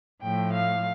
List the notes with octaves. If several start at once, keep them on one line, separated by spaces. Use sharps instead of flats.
A2 F3 A3 G5
F5